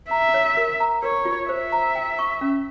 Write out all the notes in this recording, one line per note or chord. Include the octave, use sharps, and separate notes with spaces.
E5 A#5
C#5
A#4
A#5
A#4 C#5
F4
C5 E5
A#5
G5
C#6
C#4